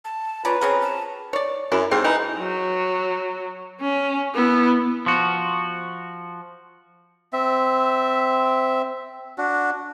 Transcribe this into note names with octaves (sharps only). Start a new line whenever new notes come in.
A5
C#4 F4 B4 D5 A#5
C4 C#4 G#4 A#4
A5
C#5 D5
F#2 E4
G#2 C4
D#4 E4 G#4 B4
F#3
C#4
B3 E4
F3 F#4
C4 E5
D4 F#4